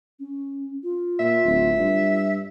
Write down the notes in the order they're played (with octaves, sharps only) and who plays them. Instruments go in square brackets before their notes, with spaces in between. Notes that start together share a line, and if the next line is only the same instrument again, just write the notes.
[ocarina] C#4
F4
[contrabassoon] A#2 [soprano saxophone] E5
[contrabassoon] D1
G2